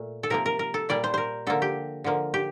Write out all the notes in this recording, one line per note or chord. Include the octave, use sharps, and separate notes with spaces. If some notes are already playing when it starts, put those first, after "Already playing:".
Already playing: A#2 A3
A4
C3 F3 A#3 A#4
A#4
A#4
A4
A#2 G3 A#3 D5
C5
A#4 C5
D3 F3 A#3 A4
G4
D3 F3 A#3
G4